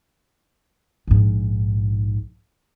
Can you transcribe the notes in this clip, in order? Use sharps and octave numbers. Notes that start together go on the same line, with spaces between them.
A#1 G#2